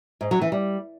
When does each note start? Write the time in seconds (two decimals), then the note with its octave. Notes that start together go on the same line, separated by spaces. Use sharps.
0.21 G#2
0.31 F#3
0.42 E3
0.52 G3